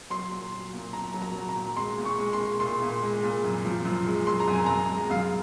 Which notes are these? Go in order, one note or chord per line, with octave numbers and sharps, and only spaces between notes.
F#3 C6
A#2
F#3
A#2
F#3 A#5
F#3
A#5
F#3
A#5
A#2
G#3 C6
A#2
C#6
G#3
C6
G#3
A#2 C6
A#2
G#3
A#2
F#2
F3
F#2
G#3
F#2 C6
A#5
F#2
G#5
F#2 A#5
G#3
F#2 F5